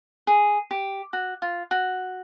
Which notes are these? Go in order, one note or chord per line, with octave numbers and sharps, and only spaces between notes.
G#4
G4
F#4
F4
F#4